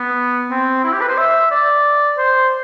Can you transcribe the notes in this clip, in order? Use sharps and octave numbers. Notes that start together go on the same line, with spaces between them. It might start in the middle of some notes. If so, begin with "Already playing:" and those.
Already playing: B3
C4
E4
G4
B4
C5
E5
D5
C5